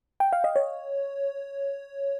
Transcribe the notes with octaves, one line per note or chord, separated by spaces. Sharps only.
G5
F5
D#5
C#5